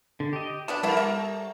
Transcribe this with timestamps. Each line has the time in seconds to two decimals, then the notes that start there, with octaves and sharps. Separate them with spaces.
0.20 D3
0.33 G4 D#5
0.68 B2 B3 D4 A5
0.83 G3 B3 D4 E4 A#4
0.97 E5